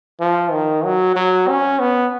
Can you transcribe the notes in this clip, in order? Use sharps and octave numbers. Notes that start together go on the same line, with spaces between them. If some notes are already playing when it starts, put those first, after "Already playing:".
F3
D#3
F#3
F#3
C#4
B3